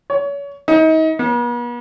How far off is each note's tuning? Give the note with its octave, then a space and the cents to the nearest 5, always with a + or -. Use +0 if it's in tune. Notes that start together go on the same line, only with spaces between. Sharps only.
C#5 +30
D#4 +35
B3 -45